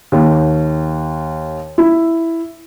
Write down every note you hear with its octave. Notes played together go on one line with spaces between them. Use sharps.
D#2
E4